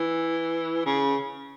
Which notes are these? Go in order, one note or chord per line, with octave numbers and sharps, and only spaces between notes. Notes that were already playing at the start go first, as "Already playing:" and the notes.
Already playing: E3
C#3